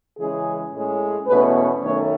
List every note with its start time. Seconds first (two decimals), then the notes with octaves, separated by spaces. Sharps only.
0.19 C#3 E3 G#3 C#4 G#4
0.73 A2 G#3 C#4
1.27 E2 B2 A3 C#4 B4
1.82 F#2 D#3 A3 C#4 C#5